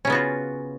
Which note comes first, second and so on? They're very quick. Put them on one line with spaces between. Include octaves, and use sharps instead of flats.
C#4 C#3 B3 F#4 F4